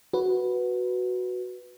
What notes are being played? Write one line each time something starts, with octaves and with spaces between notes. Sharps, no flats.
F#4 B4